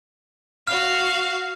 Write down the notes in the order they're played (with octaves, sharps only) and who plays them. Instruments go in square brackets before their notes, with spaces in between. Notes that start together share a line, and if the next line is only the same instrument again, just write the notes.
[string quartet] F#4 F5 [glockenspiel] F6